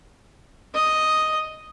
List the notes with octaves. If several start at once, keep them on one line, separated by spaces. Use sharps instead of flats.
D#5